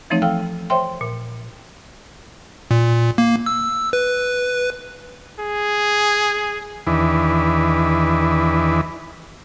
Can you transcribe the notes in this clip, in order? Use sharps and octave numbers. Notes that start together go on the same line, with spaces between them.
E3 F3 A3 C4 D#4 C#5
A4 F5 G5 E6 F6
C5 C#5 E5 G5 C6
A#2
A#2
A#3
E6
B4
G#4
E2 D#3 E3 D4 B4